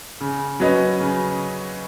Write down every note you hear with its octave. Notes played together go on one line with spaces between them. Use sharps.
C#3
F#3 C#4 B4 D#5
C#3